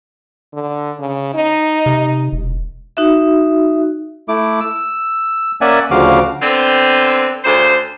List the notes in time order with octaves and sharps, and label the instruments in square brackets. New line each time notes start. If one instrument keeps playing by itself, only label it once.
[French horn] D3
C#3
D#4
[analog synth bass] C3
E1
[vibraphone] D#4 F#4 E5
[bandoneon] A3 E4 D6
E6
A#3 C#4 D5 E5 F#5 G#5
D2 C#3 F3 F#4 F5 D6
[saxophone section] D3 B3 C4
D2 C#3 C5